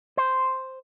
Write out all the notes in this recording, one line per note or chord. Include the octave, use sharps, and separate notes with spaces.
C5